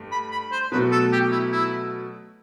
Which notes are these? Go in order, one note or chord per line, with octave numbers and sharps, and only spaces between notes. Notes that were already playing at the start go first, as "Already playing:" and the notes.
Already playing: G2 A3
B5
B5
C5
B2 F#3 A3 B4
A4
G4
E4
E4